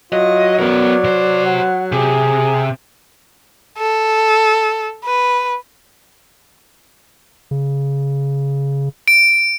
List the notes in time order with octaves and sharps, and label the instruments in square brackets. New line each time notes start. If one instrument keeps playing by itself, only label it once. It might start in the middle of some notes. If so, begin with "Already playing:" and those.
[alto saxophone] F#3 [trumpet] F4 [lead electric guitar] D#5
[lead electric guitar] B3 A#4 [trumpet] D5
[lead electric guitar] C3 C5
[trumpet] F#5
[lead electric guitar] C3 [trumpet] G#4
[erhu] A4
B4
[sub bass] C#3
[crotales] D7